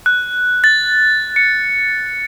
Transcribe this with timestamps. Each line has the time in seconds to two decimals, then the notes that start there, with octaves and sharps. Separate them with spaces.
0.06 F#6
0.64 A6
1.36 C#7